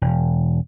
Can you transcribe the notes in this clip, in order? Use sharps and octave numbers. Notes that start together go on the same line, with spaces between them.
E1